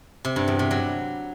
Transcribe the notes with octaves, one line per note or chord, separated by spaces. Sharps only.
C3
G2
E2
C3
F#3